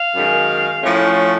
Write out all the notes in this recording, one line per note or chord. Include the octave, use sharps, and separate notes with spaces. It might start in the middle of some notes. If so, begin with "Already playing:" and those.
Already playing: F5
F#2 D#3 G#3
A2 F3 A3 C#4